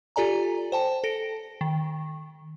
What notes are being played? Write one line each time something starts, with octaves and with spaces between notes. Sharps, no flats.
F4 G4 A4 D5 G#5 A#5
C5 G5 A5
A4 A#6 D7
D#3